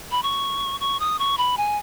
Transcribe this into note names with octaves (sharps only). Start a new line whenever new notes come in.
B5
C#6
C#6
D#6
C#6
B5
G#5